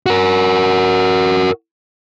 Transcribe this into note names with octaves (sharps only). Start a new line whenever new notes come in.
F#4 A#4